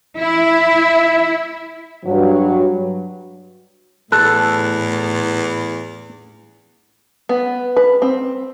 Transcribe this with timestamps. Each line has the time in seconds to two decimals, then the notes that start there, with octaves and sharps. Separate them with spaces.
0.17 E4
2.05 G2 F#3
4.12 E2 A2 A4 F#6
7.29 B3
7.77 B4
8.02 C4